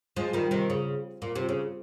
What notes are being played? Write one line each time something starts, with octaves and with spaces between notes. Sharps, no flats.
F3 G#3
D#3 G3
C3 D#3
C#3
A#2
C3
C#3